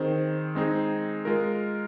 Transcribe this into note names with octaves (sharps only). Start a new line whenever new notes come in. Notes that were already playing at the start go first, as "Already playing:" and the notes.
Already playing: D#3 C4 G#4 C5
G#3 C4 D#4 G#4
G#3 F4 A#4